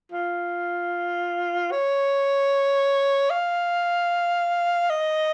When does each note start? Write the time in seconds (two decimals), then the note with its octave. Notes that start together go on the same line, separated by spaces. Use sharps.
0.12 F4
1.72 C#5
3.30 F5
4.90 D#5